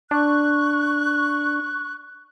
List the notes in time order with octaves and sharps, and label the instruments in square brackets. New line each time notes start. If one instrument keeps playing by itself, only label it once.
[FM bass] D4 [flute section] C#6 F#6